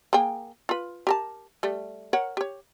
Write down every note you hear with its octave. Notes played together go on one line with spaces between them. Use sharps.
A#3 G#4 G5
F4 B4
G4 A#4 A5
G3 A3
A#4 C#5 F#5
G4 C#5